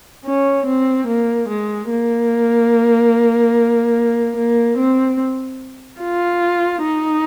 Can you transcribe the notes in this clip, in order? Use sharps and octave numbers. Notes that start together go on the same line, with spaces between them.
C#4
C4
A#3
G#3
A#3
A#3
C4
F4
D#4